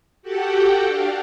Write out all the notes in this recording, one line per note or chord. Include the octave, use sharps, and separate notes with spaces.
F#4 G4 A4 F#5 G5
D4 F5